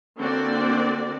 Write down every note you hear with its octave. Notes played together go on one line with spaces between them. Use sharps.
D3 A#3 C4 F#4 D5